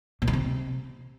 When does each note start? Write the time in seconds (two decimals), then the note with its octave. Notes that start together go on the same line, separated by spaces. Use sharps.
0.22 A#2
0.28 D#3
0.33 C3